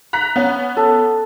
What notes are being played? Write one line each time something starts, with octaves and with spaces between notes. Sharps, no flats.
A#5 F#6 B6
B3 C#4
A4